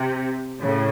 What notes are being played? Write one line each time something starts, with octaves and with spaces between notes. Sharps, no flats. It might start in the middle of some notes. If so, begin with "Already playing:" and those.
Already playing: C3
A2 C#3